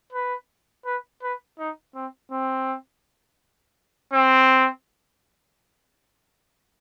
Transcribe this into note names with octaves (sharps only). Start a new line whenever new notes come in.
B4
B4
B4
D#4
C4
C4
C4